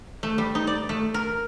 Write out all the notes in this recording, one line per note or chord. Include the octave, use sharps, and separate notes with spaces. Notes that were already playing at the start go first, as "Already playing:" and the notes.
A3
G3
D#4
D5
A3
A#4